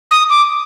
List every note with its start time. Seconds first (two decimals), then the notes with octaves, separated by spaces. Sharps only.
0.11 D#6
0.30 D6